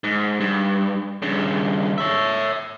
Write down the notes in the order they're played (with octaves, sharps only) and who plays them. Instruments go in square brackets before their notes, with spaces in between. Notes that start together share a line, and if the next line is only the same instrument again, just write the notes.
[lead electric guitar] G#2
G2
G2 C#3
C#5 E5